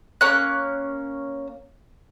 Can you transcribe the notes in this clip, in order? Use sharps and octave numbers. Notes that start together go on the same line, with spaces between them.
A#3 C#4 F#6